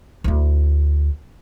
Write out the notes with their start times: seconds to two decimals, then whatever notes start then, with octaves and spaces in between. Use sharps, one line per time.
0.24 D2 E4